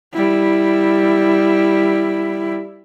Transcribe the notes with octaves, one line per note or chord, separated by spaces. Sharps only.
G3 E4